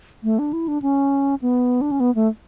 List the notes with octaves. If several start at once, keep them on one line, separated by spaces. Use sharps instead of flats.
A3
D4
E4
D4
C#4
B3
D4
C#4
B3
A3